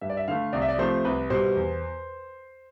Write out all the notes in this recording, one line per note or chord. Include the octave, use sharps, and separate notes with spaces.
G2 E5
D5
E5
D3 A3 F5
C2 D5
E5
D5
C3 F3 A3 C5
C2 B4
B2 G3 C5
E2